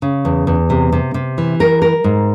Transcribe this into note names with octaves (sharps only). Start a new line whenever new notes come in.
C#3
E2
E2
C3
C3
C3
E3
A#4
A#4
G#2